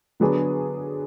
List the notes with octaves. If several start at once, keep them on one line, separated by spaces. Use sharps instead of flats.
D3 F#3 B3 D4 G#4